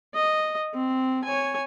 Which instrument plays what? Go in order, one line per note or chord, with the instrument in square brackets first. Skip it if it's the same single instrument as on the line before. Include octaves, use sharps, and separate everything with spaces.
[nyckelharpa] D#5
C4
C#5 G#5